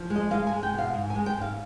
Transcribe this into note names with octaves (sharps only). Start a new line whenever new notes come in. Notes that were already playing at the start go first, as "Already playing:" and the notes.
Already playing: F3
G#3
D#5
G#3 F5
G#5
G#3
G5
B2 F5
G#2
G#5
G#3
G5
G#2 F5